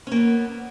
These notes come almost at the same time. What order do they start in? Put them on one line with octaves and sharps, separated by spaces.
C#4 A#3 B3